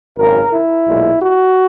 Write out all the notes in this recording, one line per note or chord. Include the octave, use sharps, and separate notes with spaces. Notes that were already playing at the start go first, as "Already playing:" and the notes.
G#1 F#2 C#3 A#4
E4
B1 A#2 G#3
F#4